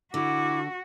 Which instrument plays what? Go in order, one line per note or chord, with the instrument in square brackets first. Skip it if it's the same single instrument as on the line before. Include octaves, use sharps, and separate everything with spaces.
[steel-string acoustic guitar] D3 [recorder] E4 [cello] F#4 [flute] D6